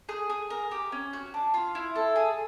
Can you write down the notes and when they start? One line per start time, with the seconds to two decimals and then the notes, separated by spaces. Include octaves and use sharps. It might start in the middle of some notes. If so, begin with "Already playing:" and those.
0.09 G#4
0.30 G#4
0.50 A#4
0.71 G4
0.92 C#4
1.13 F#4
1.34 D4
1.54 F4
1.75 E4
1.96 A4
2.16 G#4